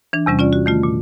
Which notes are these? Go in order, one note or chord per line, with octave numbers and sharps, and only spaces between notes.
E3 D4
E2 C3 G3 C#4
C#4 F4 D5
F#4
D#3 A3 F4
A#2